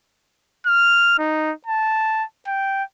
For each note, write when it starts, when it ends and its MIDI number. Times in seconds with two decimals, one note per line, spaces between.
0.66 1.16 89
1.18 1.53 63
1.66 2.24 81
2.47 2.83 79